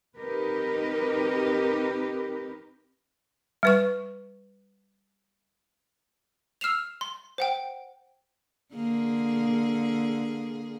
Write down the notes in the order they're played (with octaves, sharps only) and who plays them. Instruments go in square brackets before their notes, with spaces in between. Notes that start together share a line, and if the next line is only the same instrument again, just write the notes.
[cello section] C4 D#4 G4 A#4 B4
[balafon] G3 B4 C#6
[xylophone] E6 F6 C7 E7 F7
C6
C5 F#5 G5
[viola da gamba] D3 A#3 G#4